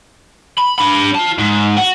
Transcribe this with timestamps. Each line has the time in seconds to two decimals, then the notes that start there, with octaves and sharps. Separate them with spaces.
0.58 B5
0.79 D4 B5
1.15 F4 A5
1.38 G#2
1.77 F#4